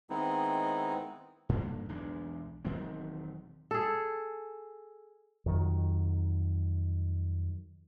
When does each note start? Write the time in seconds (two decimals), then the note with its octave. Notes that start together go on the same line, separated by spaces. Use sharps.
0.10 D#3 G#3 B3 C4 D#4 E4
1.49 G2 D3 F3 A#3
1.89 B1 E2 G#3 D4
2.65 E1 D#3 F#3 C4
3.71 G#4 A4
5.46 F2 D#3 F#3